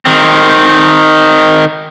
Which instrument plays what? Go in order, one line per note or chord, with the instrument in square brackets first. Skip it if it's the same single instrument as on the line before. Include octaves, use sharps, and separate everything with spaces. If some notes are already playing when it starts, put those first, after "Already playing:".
[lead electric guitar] D#3 C4